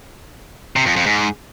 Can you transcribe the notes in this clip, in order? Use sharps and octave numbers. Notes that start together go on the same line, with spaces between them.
C3
F2
F2
G#2